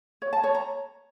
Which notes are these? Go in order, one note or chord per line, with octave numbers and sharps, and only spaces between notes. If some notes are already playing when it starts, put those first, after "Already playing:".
C#5
A5
C#5
A#5